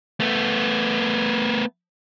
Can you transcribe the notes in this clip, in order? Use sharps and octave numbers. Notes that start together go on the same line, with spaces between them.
A3 B3